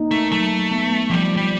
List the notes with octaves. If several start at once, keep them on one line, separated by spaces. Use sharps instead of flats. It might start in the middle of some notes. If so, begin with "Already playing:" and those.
Already playing: A#3 D#4
A3
F#3 A3
B3
F3 G3
G3